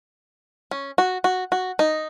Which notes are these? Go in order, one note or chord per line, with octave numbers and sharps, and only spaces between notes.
C#4
F#4
F#4
F#4
D#4